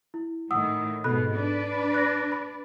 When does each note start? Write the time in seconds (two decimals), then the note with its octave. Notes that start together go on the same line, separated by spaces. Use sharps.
0.14 E4
0.51 A2 D#3 F#5 D#6 E6
1.04 G#2 B2 A4 B5 F#6
1.35 D4 B4 D5
1.94 F#6 A#6
2.32 B5